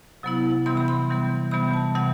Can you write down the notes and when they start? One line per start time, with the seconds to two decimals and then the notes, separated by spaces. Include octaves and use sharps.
0.23 C3 F#3 B3 E4
0.66 C3 E3 G3 B3 C6
0.77 B5
0.88 C6
1.09 C3 E3 G3 B3
1.51 C3 E3 G3 B3 B5
1.73 A5
1.95 C3 E3 G3 B3 F#5